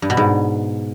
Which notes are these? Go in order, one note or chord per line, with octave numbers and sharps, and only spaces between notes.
G2
B2
G#2